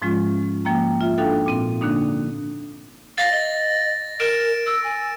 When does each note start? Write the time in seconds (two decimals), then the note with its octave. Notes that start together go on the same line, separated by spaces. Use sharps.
0.02 G#2 F3 G#3 C#4 F4
0.65 F3 A#3 G5 A#5
1.01 F4 E5
1.17 D4 D#4 F#4 A4 F5 G5
1.46 A#2 C4
1.81 D3 A#3 D4 D#4
3.18 F5 A6 A#6
3.32 D#5
4.20 A#4 D7 E7
4.66 E6
4.84 G#5